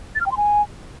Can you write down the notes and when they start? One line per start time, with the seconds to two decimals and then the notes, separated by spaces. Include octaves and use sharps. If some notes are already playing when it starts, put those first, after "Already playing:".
0.15 A6
0.21 F6
0.26 G5
0.31 C6
0.37 G#5